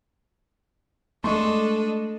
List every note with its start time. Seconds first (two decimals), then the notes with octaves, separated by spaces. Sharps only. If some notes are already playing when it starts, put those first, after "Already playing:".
1.24 G#3 A3 D4 A4 D#5 C6 C#6